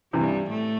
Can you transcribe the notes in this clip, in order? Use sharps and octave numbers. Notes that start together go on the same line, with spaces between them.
G2 C3 E3 G3
A2 A3